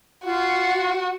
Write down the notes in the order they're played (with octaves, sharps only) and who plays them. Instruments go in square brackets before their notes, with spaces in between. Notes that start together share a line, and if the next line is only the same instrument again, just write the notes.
[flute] F4 [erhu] F#4